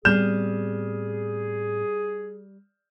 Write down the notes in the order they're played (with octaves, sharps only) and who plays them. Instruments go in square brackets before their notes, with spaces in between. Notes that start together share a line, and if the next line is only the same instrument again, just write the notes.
[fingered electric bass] A2 B3 C4 [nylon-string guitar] G3 [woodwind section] G#4 [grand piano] F6 G6 E7